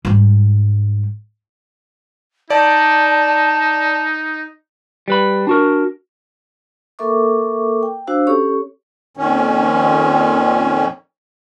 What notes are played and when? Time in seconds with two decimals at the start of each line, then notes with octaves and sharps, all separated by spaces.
0.05 G#2 G3
2.50 D#4 D5 A5
5.08 G3 B4 B5
5.47 D4 F#4 A#4
6.99 A#3 A4 A#4 E5 C#6 D6
7.83 G5
8.07 D4 F#4 C5 F5 E6
8.27 C#4 G4 A4 C#5 C#6
9.17 F2 A#2 D#3 C#4